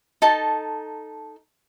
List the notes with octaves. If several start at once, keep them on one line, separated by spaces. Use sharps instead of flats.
D#4 A4 A5